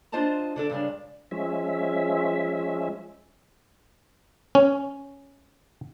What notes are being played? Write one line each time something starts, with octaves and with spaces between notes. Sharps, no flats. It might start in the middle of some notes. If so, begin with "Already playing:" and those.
D4 F4 C5 D#5 A5 A#5
D3 D4 A4
G2 C#3 G#3 D4
F3 G#3 C#4 E5
C#4